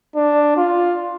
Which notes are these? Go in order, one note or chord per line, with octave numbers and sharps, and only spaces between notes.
D4
F4